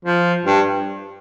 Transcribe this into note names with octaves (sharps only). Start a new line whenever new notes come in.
F3
G2